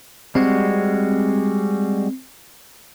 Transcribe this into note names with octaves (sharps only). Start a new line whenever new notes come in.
G3 G#3 C4 F#4